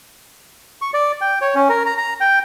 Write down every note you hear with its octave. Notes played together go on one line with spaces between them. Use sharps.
C#6
D5
G5
C#5
C#4
A#4
A#5
A#5
G5